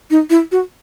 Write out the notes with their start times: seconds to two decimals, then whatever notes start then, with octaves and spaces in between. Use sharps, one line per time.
0.10 D#4
0.30 E4
0.52 F#4